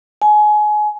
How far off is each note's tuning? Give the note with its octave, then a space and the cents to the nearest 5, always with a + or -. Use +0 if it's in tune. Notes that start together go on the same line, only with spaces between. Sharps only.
G#5 +25